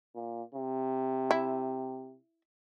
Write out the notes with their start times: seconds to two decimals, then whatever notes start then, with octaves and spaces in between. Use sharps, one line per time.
0.15 A#2
0.55 C3
1.31 E4